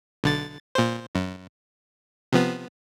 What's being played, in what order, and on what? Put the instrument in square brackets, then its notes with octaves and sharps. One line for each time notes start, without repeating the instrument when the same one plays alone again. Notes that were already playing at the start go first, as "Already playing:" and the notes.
[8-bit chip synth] B1 D3 A6
A#2 C5
F#2
C3 F3 B3